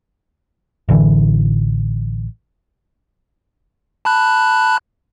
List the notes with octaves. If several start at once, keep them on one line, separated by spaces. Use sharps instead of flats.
A1 D3 E3
A5 B5 F#6